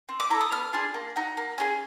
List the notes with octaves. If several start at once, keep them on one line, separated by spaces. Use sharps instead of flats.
C4
D6
E4 A4 A#5
D#6
B3 F6
D4 F4 G#4
A#3
D#4 F#4
A#3
C#4 F4 G#4